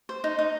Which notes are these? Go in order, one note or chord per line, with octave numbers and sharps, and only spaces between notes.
C5
D#4
D#4